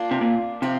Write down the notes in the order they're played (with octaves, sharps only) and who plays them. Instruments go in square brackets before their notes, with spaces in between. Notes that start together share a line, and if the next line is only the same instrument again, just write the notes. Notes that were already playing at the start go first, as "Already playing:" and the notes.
Already playing: [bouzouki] A#3 D4 F4
[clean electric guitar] C3
A#2
[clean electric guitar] C3 [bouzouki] F3 C4 F4